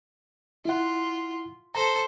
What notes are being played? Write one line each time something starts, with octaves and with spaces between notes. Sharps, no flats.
E4 F4 F#5
A4 C5 A#5